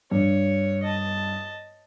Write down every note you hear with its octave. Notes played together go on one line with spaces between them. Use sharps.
G2 C#5
D#5 A5